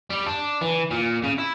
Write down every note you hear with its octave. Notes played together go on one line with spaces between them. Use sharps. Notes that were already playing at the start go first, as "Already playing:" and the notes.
G3
D4
E3
A#2
C#3
E4